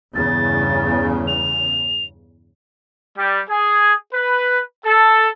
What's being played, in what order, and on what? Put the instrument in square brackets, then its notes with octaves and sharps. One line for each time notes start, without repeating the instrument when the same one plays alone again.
[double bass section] E2 G2 C#3 [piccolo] A6
[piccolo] F7
[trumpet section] G3
G#4
B4
A4